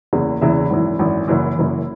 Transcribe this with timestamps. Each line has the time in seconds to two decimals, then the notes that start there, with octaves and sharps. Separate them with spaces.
0.13 F#1 E2 C#3 E3
0.41 F#1 E2 C#3 E3 E5
0.52 C#5
0.61 E4
0.70 G#1 F#2 E3
0.99 G#1 F#2 E3
1.28 F#1 F#2 E3 E4
1.56 F#1 F#2 E3